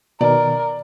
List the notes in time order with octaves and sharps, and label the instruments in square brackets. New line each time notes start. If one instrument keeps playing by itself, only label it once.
[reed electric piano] B2 D#3 [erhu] A#4 [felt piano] D5